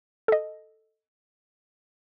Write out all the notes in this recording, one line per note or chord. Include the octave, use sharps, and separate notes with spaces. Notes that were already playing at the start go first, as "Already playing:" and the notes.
A4 D#5